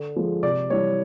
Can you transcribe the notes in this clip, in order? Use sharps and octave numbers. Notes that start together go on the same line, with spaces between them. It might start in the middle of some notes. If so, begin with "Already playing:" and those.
Already playing: D3
F3 G#3
C3 D5
E3 G3 C#5